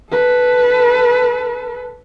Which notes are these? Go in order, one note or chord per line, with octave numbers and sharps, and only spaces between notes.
A4 B4